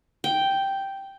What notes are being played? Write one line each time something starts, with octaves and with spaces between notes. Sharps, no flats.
G5